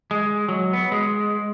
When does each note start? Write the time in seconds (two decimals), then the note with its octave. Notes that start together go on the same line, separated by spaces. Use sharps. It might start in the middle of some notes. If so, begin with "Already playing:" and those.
0.11 G#3
0.49 F#3
0.73 B3
0.92 G#3